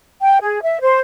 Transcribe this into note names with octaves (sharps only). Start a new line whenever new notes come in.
G5
G#4
E5
C5